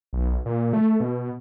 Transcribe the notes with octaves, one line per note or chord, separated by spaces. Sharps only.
B1
A#2
A3
B2